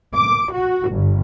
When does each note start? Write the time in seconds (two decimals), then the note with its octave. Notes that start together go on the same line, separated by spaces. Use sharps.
0.14 D6
0.52 F#4
0.90 G1